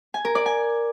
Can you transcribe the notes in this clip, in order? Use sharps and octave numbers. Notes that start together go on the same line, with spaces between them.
G#5
A#4
D5
G#5